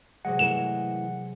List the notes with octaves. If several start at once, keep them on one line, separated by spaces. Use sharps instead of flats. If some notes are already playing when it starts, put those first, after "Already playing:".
C3 F#3 G#3 F#5
E3 A3 A#4 E7